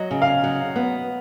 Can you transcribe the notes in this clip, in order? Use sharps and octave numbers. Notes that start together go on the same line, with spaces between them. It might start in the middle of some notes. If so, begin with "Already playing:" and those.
Already playing: F#3 D#5
C#3
F5
F#3
B3